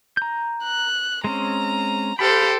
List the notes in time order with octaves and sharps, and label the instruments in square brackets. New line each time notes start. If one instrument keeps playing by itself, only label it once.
[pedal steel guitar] A#5 G6
[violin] F#6
[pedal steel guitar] G#3 C4 C#4 [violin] A#5
[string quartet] G4 A4 C5 [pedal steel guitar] F5 B5 [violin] G5